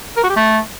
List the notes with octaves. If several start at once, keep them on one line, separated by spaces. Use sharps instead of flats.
A#4
F#4
G4
A3